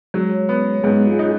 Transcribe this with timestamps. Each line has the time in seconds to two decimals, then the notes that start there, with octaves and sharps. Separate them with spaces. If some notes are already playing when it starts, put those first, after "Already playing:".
0.14 F#3 G#3
0.49 B3
0.84 G#2 G#3 B3
1.07 F4 G#4
1.19 D#4